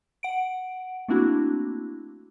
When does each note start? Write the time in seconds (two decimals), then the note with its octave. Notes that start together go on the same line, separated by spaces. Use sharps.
0.23 F#5 D7
1.08 A3 A#3 C4 D4 E4 F#4